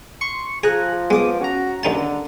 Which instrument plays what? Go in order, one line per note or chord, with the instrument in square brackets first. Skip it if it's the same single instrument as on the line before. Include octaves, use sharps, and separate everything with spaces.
[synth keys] C6 C#6 C#7
[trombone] F3 [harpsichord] G#4 [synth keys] G#5 A#5 F#6
[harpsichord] G#3 [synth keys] B3 D6 D#6
[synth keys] C#4 A#5 [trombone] F#4
[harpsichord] D#2 D#4 A5 [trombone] D3